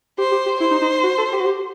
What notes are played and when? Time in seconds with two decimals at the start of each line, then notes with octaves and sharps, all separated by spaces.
0.18 G4 C5
0.32 G4
0.46 G4
0.60 E4 C5
0.71 D#4
0.81 D#4
1.03 F#4
1.18 A4
1.33 G4
1.40 F#4
1.46 G4